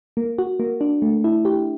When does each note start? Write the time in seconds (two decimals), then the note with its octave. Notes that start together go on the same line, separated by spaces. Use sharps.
0.17 A#3
0.39 F#4
0.60 A#3
0.81 D4
1.02 A3
1.24 E4
1.45 G4